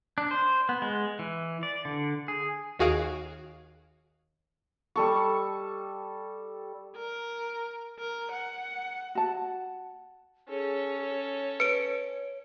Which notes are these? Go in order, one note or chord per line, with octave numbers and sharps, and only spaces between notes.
D4
C5
B3
G#3
E3
D5
D3
G#4
D#2 F#4 G#4 F5 D7
G3 A4 C#6
A#4
A#4
F#5
F#4 A5
C#4 G#4 A4
C#5
B4 C#7 D7